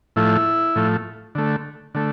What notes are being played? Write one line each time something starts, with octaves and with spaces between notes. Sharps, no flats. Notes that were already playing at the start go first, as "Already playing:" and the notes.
A2 F3 A3 E4
A2 F3 A3
D3 A3
D3 A3